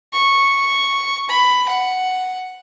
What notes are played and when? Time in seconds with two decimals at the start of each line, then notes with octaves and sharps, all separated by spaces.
0.13 C#6
1.29 B5
1.68 F#5